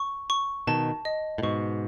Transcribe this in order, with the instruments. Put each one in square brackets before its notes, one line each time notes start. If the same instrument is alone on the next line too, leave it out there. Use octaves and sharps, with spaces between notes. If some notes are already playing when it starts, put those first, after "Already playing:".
Already playing: [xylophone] C#6
C#6
[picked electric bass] B2 D#3 [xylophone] A5
[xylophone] D#5
[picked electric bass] A2
[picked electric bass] G#2 B2 [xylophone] C#6